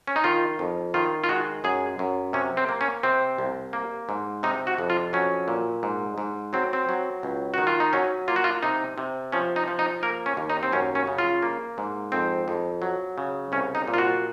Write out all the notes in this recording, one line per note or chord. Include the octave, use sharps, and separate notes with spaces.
C#4
D#4
D#3 F4
F2
D#3 F4
F4
G#3 F#4
F#2 G#4
F#2
C3 C#4
C4
A#3
C#4
C3 C4
C2
A#3
G#2
C3 D#4
F#4
F2
F4
F#3 C#4
A#2
G#2
G#2
F#3 C4
C4
F#3
C#2
D#3 F#4
F4
D#4
F#3 C#4
A#3 F4
F#4
F4
C3 D#4
C3
F3 C#4
D#4
F3
D#4
A#3 A#4
C#4
D#2
D#4
C4
F#2 C#4
C#4
C#3
F4
A#3
G#2
F2 C4
F2
F#3
C#3
C2 C#4
D#4
A#2
F4
F#4